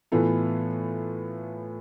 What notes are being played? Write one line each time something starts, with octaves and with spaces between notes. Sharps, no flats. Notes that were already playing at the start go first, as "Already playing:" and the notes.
A2 E3 B3 F4 A4